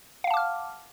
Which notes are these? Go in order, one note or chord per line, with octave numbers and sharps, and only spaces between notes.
F5 F#5 A5 D6 F6